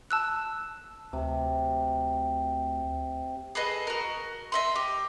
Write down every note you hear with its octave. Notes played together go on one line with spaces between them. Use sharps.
A5 E6 F#6
D2 C3
G#4 A4 B4 D#5
F#4 A#4
D#5 E5 C6
G4